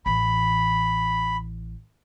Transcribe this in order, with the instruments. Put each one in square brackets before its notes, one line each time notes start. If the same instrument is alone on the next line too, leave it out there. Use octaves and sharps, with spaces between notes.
[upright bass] A1 E3 [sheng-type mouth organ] B5